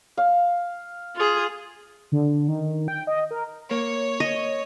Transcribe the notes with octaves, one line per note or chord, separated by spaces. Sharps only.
F5
F4 G#4
D3
D#3
G5
D#5
A#4
A#3 C#5
D#5